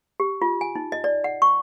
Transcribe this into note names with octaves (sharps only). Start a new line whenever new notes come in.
G4
F4
G#5
D#4
D#5
D5
F#5
C#6